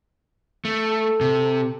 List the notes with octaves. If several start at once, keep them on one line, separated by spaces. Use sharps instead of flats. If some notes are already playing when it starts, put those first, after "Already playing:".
A3
A4
C3